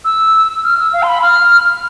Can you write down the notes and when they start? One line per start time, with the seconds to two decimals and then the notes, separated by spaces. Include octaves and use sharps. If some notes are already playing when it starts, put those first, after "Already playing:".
0.05 E6
0.64 F6
0.78 E6
0.93 F5
1.03 C6
1.08 B5
1.23 F6